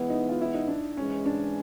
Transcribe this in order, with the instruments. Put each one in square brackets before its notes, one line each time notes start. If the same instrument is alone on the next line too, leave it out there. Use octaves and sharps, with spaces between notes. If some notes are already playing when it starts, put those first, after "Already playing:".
Already playing: [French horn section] E3 G#3 B3 [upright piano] E4
[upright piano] D#4
F4
E4
D#4
D4
[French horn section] G#2 E3 G#3 [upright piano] C#4
[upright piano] D4